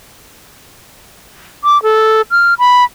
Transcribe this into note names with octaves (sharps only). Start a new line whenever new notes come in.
D6
A4
F6
B5